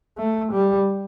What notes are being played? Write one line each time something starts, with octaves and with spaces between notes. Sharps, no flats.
A3
G3